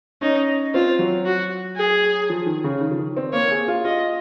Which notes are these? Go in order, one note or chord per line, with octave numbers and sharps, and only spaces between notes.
C#4 D#4
C4 F4
F#3
F#4
G#4
F3
D#3
C#3
D#3
F3
D#3
C4
A#3 C#5
G#4
F4
F4 D#5